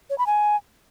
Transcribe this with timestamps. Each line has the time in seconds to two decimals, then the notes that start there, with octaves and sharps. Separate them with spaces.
0.10 C#5
0.18 B5
0.27 G#5